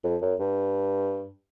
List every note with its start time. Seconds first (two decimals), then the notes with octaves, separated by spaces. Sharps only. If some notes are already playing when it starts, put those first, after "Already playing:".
0.04 F2
0.22 F#2
0.39 G2